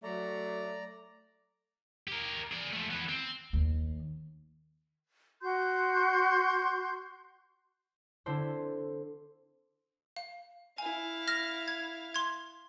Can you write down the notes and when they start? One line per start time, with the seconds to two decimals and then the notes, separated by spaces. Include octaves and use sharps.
0.04 F#3 A3 D5 A#5
2.08 G4 A#4
2.52 G#4 D5
2.73 F3 A3
2.91 E3 B3
3.09 C4
3.53 D#2
5.42 F#4 C6 G6
8.26 D3 C4 D4 E4 A4 C5
10.17 F5
10.78 E4 F5 G#5
11.28 F6 A#6
11.68 G#6
12.14 C6 G#6